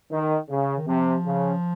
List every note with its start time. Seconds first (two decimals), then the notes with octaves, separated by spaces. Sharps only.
0.11 D#3
0.49 C#3
0.77 D#3
0.88 C3 F3
1.26 C#3